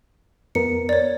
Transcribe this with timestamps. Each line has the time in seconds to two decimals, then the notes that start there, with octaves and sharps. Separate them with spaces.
0.55 F2 B3 A#4 C#7
0.89 C#5 D5